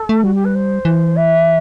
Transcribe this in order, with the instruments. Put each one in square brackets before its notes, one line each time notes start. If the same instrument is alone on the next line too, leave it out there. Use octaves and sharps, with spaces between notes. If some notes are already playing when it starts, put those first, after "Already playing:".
Already playing: [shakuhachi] A4
[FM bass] A3
[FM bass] G3 [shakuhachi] F#4
[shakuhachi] G4
B4
C5
[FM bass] E3
[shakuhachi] E5